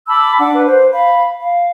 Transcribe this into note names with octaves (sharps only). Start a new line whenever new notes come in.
A5 B5 D6 E6
D4 F#5 D6
B4
C5
F5 B5
F5